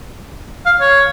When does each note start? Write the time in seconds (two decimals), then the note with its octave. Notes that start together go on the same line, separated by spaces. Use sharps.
0.66 F5
0.81 C#5